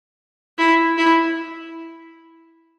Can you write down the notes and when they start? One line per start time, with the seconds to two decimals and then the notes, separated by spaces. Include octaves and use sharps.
0.58 E4
0.98 E4